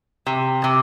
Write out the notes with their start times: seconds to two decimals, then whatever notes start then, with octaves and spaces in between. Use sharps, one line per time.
0.26 C3
0.64 C3